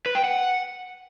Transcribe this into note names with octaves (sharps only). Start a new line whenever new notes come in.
B4
G5
F#5